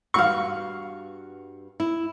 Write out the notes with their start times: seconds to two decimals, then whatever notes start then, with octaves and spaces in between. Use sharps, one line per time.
0.14 G2 B3 F#4 F5 C#6
1.80 E4